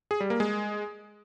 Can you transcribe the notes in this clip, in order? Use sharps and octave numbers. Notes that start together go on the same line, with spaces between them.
G#4
G3
A#3
G#3